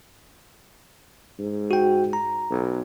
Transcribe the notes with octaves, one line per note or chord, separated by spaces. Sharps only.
G#2
F#4 G5
A#5
B1